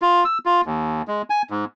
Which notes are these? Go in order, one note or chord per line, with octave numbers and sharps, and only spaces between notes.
F4
E6
F4
D#2
G#3
G#5
G#2